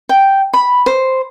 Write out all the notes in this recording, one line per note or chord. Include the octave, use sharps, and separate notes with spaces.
G5
B5
C5